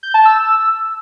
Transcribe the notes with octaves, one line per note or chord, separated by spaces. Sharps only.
G6
A5
E6